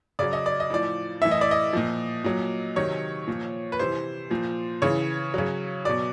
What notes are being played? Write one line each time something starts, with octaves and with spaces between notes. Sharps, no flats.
C#3 F#3 D5
D#5
D5
D#5
A2 F3 D5
A2 E3 E5
D#5
D5
D#5
A#2 F3
A#2 F#3
C3 D#3 F#3 C#5
A#2 F3
B4
C3 E3 C5
A#2 F3
C#3 E3 C#5
C#3 F#3
B2 F#3 D5